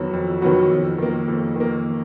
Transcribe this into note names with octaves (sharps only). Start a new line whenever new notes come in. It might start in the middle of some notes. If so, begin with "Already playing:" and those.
Already playing: F2 D#3 F#3 B3 F#4
F2
D#3 F#3 B3 F#4
F2
D#3 A#3
F2
D#3 A#3